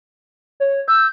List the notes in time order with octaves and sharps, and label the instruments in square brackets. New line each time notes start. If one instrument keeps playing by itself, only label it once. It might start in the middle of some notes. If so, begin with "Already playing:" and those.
[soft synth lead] C#5
[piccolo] E6 [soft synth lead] G6